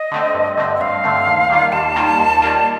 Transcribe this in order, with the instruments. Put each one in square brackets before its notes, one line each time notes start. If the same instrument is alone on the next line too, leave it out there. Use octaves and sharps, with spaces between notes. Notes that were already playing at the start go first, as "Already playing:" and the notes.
Already playing: [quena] D#5
[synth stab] D3 A3 C4
G2
D3 A3 C4
[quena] D#5
[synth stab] G2 [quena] F5
[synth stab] D3 A3 C4
D#2
D#3 G3 A#3 F4
[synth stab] D#2 [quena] A5
[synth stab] D#3 G3 A#3 F4
D#2
D#3 G3 A#3 F4